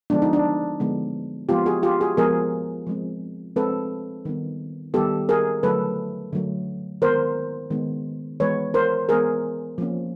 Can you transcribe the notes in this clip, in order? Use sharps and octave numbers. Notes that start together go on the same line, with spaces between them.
D3 F3 G#3 B3 D4
D#4
D4
D3 F3 G#3 B3
F3 G#3 B3 F4 G4
F#4 G#4
F4 G4
F#4 G#4
F3 G#3 B3 G#4 A#4
F3 G#3 C4
F3 G#3 C4 A4 B4
D#3 G3 B3
D#3 G3 B3 G4 A4
G#4 A#4
D3 F#3 A3 A4 B4
D3 F#3 A3
D#3 G#3 B3 A#4 C5
D#3 G#3 B3
E3 G#3 B3 B4 C#5
A#4 C5
E3 G#3 B3 G#4 A#4
F3 A#3 C#4